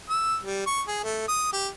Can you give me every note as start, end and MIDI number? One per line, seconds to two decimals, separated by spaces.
0.10 0.37 88
0.43 0.66 55
0.66 0.82 85
0.88 1.03 68
1.04 1.27 57
1.28 1.49 87
1.53 1.69 67